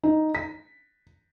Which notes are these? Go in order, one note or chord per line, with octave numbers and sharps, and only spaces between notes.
D#4
B6